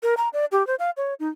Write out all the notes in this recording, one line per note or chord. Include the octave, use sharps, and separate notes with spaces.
A#4
A#5
D5
G4
C5
F5
C#5
D#4